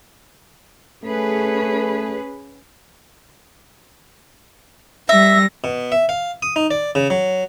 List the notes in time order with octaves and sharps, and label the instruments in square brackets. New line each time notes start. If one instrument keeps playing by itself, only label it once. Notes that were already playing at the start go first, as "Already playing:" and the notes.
[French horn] A3 [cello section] C#4 G#4 B4
[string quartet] G3 A#6 [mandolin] E5
[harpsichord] B2
E5
F5
D#6
D#4
D5
C#3
F#3